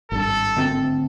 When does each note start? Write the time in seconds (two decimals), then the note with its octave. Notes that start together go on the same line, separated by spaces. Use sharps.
0.12 G#1 G2 A4
0.57 D2 C4 A5